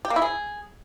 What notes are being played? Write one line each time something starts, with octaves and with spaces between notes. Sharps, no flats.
G4
A#3
E4
G#4